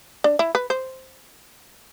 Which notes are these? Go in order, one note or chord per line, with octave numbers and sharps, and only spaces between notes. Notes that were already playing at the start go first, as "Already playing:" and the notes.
D4
E4
B4
C5